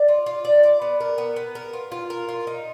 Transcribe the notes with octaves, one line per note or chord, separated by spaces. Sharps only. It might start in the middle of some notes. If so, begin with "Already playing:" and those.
Already playing: D5
F4
F4
D5
D5
B3
A#4
B3
B3
A#4
F4
F4
A#4
F4
D#4